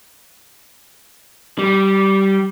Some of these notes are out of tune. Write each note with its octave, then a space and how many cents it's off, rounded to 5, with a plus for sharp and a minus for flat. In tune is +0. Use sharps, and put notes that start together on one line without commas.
G3 -15